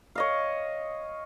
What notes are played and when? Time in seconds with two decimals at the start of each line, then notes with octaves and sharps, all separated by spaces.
0.15 C#5 D#5 F5